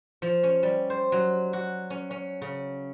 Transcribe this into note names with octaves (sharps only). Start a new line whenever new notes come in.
F3
C#4
G3
C5
F#3
F#4
C#4
C#4
C#3